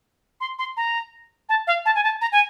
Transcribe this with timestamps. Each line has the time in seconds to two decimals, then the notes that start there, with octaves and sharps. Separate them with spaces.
0.40 C6
0.58 C6
0.77 A#5
1.49 A5
1.67 F5
1.85 A5
1.95 G#5
2.03 A5
2.21 A#5
2.32 G#5